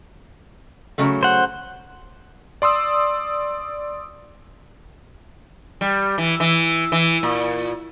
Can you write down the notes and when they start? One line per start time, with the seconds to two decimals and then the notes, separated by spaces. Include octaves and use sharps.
0.98 C#3 F#3 A3
1.23 C5 F#5
2.62 D5 C6 D#6 E6
5.81 G3
6.18 E3
6.40 E3
6.92 E3
7.23 A#2